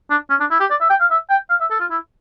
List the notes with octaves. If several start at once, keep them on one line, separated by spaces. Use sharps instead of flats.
D4
C#4
D4
E4
G4
D5
E5
G5
F5
E5
G5
F5
E5
A4
F4
E4